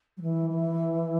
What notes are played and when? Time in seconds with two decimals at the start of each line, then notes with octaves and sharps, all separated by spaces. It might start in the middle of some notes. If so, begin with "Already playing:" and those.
0.17 F#3
0.22 E3
0.50 E3